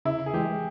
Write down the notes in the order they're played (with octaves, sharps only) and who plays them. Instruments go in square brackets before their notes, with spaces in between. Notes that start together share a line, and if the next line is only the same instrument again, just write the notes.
[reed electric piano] C#3 [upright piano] E4
[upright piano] G#4
[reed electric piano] E3 G#3 [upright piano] G4